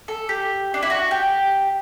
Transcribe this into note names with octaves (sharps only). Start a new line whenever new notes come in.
A4
G4
D4
E4
F#4
G4